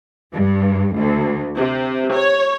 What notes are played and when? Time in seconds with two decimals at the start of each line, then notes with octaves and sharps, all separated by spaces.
0.33 G2
0.96 D2
1.56 C3
2.14 C#5